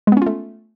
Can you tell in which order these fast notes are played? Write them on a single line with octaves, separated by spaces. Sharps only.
G#3 B3 C#4 F4 A3